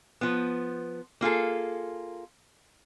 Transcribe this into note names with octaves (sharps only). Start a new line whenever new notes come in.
F3 B3
A#3 F4 G#4 A4